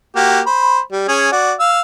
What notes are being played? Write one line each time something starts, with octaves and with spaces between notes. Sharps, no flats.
A#3 F#4 G4
C5 B5
G3
C#4 G#4
F#4 D5
F5 E6